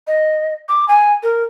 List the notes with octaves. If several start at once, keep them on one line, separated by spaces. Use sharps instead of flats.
D#5
D6
G#5
A#4